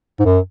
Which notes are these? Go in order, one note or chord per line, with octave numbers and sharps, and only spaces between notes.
G#2
F#2